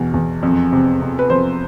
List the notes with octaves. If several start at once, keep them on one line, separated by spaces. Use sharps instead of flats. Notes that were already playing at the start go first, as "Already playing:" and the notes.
Already playing: E2 B2
E2
F2
C3
C3
B4
F2 C5